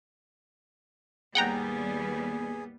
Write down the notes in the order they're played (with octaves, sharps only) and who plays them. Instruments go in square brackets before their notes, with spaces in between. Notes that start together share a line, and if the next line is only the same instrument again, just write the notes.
[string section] D#2 G#2 [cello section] G3 B3 [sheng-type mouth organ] G#4 [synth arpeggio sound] F#5 G5 A#5